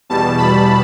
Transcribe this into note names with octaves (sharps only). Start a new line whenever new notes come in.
E2 B2 G3 A5
B5